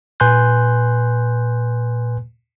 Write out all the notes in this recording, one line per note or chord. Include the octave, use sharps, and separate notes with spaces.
A#2 B4 G#5 C6 F#6 G6